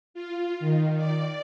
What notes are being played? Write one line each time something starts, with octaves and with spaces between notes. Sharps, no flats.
F4
D#3
D5